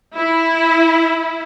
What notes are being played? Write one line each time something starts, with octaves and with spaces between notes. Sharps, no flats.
E4